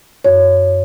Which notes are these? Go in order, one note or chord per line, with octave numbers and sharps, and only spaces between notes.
F#2 C#5